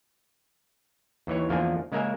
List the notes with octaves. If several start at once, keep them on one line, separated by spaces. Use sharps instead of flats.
D#2 E3 C#5
E2 F3 A#3 D4 G#5
C#3 G#3 A#3 A#4 E5 G#5